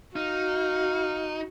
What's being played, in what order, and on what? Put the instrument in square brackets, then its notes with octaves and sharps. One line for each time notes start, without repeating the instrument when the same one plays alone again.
[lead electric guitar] D#4 [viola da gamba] F#4 [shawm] F5